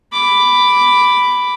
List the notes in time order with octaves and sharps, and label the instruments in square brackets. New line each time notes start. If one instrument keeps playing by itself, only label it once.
[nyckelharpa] B5 D6